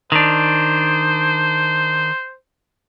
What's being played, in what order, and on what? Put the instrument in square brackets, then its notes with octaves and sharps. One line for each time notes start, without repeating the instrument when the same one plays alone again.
[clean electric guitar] D#3 D4 [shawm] C5